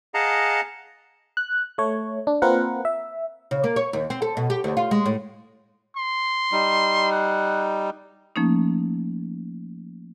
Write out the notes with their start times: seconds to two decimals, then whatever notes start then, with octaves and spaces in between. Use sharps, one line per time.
0.14 G#4 D#5 F5 F#5 A5 A#5
1.37 F#6
1.78 A3 C#5
2.27 D4
2.42 A#3 C4 F4 A#4 B4 F#5
2.85 E5
3.51 C#3
3.64 A#3
3.76 C#5
3.93 D#2
4.10 C4
4.22 A4
4.37 B2
4.50 G4
4.64 D2
4.77 F4
4.91 G#3
5.06 A2
5.97 C6
6.52 G3 D#4
7.11 F#5
8.36 F3 A3 A#3 C#4 D#4